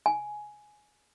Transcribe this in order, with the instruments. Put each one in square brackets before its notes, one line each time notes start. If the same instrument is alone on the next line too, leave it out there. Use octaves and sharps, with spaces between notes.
[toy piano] G#5